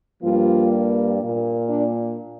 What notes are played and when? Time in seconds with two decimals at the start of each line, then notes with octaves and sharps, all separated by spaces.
0.22 G2 F3 G3 A#3 F4
1.21 A#2 A#3
1.69 D4